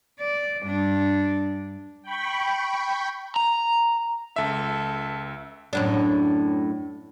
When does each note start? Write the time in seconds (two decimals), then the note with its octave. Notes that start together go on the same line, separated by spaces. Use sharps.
0.20 D5
0.63 G2 D4
2.02 G5 B5 C#6
3.36 A#5
4.36 C#2 A4 E5
5.73 F#2 A2 D4